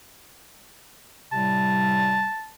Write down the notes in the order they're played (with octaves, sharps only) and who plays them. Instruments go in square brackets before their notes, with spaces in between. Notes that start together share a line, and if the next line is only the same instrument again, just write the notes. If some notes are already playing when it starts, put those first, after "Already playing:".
[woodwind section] A2 C3 G3 [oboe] A5